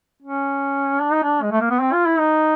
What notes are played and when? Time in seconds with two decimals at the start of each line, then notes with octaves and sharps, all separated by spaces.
0.22 C#4
1.01 D4
1.12 D#4
1.23 D4
1.42 G#3
1.52 A3
1.61 A#3
1.70 B3
1.80 C4
1.93 F4
2.06 E4
2.19 D#4